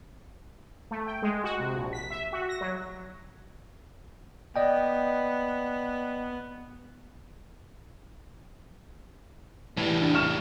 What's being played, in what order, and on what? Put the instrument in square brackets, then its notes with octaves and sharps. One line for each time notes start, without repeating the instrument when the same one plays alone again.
[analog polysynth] A3
G5
G#3
F#4
C3
A#1
B6
E5
F#4
A#6
F#3
[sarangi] B3 [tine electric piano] D5 D#5 G5
[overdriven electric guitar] A2 G3 [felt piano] E3
[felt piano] D4
C#6 F6 E7